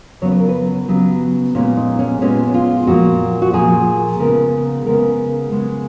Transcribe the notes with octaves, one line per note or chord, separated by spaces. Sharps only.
C#3 F#3 B3 C#5
B4
A#4
B4
C#3 F#3 B3
A#2 G#3 B3 C#4
D#4
C#4
A#2 G#3 B3 C#4
F4
A#2 F3 A#3 F#4
F#4
A#2 F3 A#3 G#4
C#3 G#3 B3 A#4
C#3 G#3 B3 A#4
C#3 G#3 B3